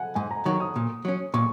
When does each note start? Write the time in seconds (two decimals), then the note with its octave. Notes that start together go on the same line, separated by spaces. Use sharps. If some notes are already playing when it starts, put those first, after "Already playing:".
Already playing: F#5 G#5
0.15 G#2 G#5
0.31 A#5
0.46 D#3 F#3 C#6
0.60 D#6
0.76 A#2
1.05 F#3 C#4
1.34 A#2 C#6